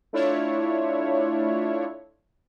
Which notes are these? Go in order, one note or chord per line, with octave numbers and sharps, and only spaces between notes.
A3 D4 E4 F4 C#5